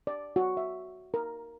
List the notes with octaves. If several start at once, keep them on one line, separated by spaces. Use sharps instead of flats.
D5
F#4
E5
A#4